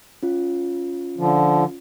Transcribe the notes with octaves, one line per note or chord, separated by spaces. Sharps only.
C#4 F4
D3 F3